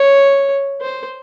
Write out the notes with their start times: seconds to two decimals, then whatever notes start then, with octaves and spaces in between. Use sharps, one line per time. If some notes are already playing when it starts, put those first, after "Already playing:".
Already playing: C#5
0.81 C5